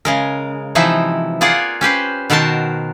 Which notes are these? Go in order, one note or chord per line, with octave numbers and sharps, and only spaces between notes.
C#3 G#3 A#4
C3 E3 F3 D#4 E4
A#3 F4 G#4 D5 F#5
C#4 G4 B4 C5
B2 D#3 F#4 A#4 C5 A5